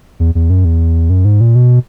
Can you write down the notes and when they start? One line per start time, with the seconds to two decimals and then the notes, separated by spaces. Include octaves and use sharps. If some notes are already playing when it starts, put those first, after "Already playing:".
0.20 E2
0.35 E2
0.50 F#2
0.65 E2
1.10 F#2
1.25 G#2
1.41 A#2
1.55 B2